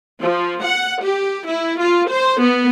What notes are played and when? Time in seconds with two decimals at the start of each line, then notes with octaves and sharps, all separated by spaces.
0.21 F3
0.64 F#5
1.02 G4
1.47 E4
1.79 F4
2.10 C5
2.41 B3